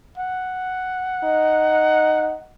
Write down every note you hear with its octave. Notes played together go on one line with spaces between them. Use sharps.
F#5
D#4